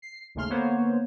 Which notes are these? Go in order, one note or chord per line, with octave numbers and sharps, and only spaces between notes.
C7
G#1 D#2 C#3 A3 C6 F6
D3 A#3 B3 C5 C#5